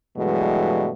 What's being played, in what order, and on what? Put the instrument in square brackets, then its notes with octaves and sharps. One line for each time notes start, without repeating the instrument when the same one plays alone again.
[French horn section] G2 B2 E3 F#3 G#3 A3